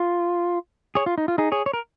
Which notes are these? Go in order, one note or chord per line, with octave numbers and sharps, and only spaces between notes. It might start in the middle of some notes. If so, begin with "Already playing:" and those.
Already playing: F4
G#4 C#5
F4
D#4
F4
D#4 G#4
G#4 C#5
C#5
A#4